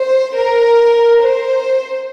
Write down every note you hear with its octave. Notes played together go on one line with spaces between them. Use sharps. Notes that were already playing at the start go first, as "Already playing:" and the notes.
Already playing: C5
A#4
C5